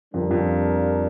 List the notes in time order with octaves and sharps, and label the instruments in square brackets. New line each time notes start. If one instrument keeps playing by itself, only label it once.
[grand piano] F2 [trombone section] G3 D4 F4 A#4
[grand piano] F2